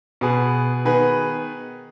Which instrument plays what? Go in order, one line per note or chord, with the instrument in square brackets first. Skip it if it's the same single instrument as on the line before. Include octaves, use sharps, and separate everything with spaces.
[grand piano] B2 B3 G#4 B4
D#3 B3 G#4 B4